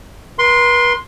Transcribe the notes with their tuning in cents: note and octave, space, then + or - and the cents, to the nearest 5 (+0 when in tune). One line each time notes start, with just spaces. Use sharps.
B4 -40 C6 +0